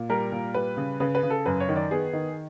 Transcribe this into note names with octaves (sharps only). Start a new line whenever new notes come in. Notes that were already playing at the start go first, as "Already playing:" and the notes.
Already playing: A#2
G3 A#4
A#2
G3 B4
C#3
C#3 B4
B4
C#3
A4
F#2 B4
C#5
D#3
D5
B3 G#4
D#3